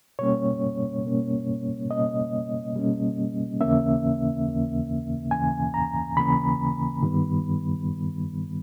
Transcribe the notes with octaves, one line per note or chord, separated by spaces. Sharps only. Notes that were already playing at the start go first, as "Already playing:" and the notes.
B2 G3 A#3 C#4 C#5
B2 G3 A#3 C#4
B2 G3 A#3 C#4 D#5
B2 G3 A#3 C#4
D#2 C#3 E3 A#3 C#4 E5
D#2 C#3 E3 A#3 C#4
D#2 C#3 E3 A#3 C#4 G#5
A#5
D#2 C#3 E3 A#3 C#4 B5
G2 D#3 G3 B3